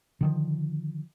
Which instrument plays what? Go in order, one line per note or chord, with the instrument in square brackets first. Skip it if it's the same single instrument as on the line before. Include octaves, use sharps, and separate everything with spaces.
[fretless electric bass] D3 D#3 F3